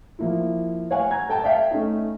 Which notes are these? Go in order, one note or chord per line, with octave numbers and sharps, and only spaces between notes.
F3 A#3 E4
C#5 F5 F#5 G#5
A#5 G#6
A4 G5 A5
D5 E5 F5 G5
A3 C#4 D#4